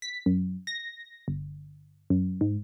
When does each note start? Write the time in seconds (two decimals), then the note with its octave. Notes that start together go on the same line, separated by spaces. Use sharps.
0.02 B6
0.26 F#2
0.67 A#6
1.28 G1
2.10 F#2
2.41 G#2